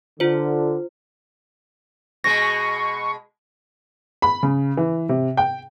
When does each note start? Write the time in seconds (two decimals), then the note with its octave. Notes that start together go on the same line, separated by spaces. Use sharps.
0.20 D3 F4 C5
2.24 B2 G#3 C#6 A#6
4.22 B5
4.43 C#3
4.77 E3
5.09 C3
5.37 G5